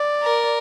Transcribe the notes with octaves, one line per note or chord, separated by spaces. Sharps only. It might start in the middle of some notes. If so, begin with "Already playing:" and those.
Already playing: D5
A#4